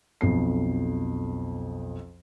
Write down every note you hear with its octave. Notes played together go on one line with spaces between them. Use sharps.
B1 F2 C7